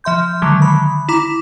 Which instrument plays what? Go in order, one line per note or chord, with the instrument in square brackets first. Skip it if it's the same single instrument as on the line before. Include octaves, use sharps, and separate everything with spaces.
[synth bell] F3 E5 C6 G6
D3 D#3 F#3 G#3
B5
E4 A#5 D6